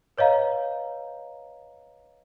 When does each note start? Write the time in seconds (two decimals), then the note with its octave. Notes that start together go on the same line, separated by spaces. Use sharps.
0.18 B4 C#5 D#5 F5 A#5